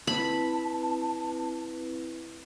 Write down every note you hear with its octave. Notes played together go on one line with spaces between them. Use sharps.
C4 E4 B4 A5 B5